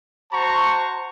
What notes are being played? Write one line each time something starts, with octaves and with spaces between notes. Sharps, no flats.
F#4 C5 A5 A#5 C#6